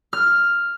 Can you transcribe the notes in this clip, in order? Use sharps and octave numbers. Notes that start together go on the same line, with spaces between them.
F6